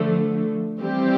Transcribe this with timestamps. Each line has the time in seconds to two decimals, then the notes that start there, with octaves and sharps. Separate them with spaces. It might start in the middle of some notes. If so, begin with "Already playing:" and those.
Already playing: D3 F3 A3
0.80 E3 G3 C4 G4